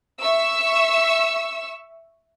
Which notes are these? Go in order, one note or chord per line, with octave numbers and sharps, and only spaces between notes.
E5 C#6 E6